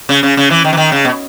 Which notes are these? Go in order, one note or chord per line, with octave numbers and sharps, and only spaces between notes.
C#3
C#3
C#3
E3
D#3
E3
D#3
C#3
B2